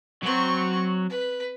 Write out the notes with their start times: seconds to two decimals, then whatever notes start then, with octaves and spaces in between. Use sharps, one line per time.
0.23 F#3 C4 F#4 C#6
1.10 B4